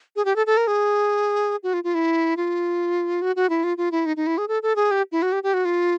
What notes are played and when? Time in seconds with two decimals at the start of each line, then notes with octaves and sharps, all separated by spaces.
0.16 G#4
0.25 G4
0.36 A4
0.47 A4
0.57 A#4
0.67 G#4
1.63 F#4
1.74 F4
1.84 F4
1.94 E4
2.37 F4
3.22 F#4
3.36 F#4
3.50 E4
3.64 F4
3.77 F4
3.92 E4
4.06 D#4
4.17 D#4
4.27 E4
4.38 G#4
4.48 A4
4.63 A4
4.76 G#4
4.91 G4
5.12 E4
5.22 F#4
5.32 G4
5.43 G4
5.54 F#4
5.65 F4